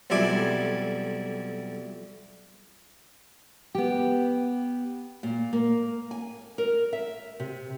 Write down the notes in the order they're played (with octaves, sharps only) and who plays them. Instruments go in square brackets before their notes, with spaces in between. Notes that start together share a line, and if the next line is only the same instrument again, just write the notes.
[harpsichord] B1 F2 G3 E4 G#5 D6
[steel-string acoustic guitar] B3 G4
[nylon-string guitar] A#2
A#3
G#5
A#4
E5
C3